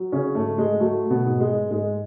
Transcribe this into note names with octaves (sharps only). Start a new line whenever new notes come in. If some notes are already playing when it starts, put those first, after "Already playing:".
Already playing: F#3
C#3 C#4
G#2 A3
G#3
F#3 A3
B2 B3
G#2
G#3
G#2 G#3